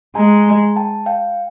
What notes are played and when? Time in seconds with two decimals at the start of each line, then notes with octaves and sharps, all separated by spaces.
0.15 G#3 G#5 A#5
0.76 G5 A5
1.06 F5 G5